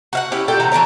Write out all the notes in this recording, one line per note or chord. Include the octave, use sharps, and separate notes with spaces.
F#4 F5 F#5
C#4 E4 G4
A#2 G3 A4 G5
C3 E3 F#4 A#5
E3 D4 A#4 C#5